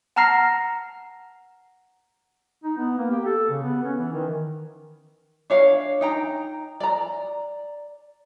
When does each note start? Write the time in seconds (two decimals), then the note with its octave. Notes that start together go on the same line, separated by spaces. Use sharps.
0.16 F#5 A5 A#5 F6 A#6 C7
2.64 D#4
2.78 B3
2.98 A#3
3.11 G4
3.26 A4
3.50 C#3
3.63 B3
3.84 C#4
3.98 E3
4.13 D#3
5.50 D4 C#5 F5
6.01 D#4 G5 A#5
6.80 D5 A#5